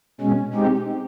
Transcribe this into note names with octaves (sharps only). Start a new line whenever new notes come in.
B2 G#3 C#4
G#3 C4 D#4 G4